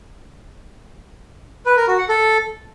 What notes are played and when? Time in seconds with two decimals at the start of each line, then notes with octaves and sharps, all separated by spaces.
1.66 B4
1.77 A#4
1.87 F#4
1.98 F#5
2.09 A4